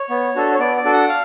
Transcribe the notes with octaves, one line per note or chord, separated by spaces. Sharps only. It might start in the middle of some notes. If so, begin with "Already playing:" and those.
Already playing: C#5
B3
D4 F#4 A4
C#5
B3 D5
D5
D4 F#4 A4
F#5
F5